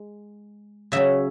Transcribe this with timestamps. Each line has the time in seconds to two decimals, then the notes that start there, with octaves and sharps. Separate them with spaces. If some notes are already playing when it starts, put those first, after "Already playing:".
Already playing: G#3
0.92 C#3 F#3 C#4 E5